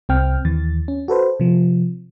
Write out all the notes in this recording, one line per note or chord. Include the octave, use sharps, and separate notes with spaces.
C2 C4 G5 F6
D#2 E3 A6
C#4
F#4 A4 B4 C5
C3 F3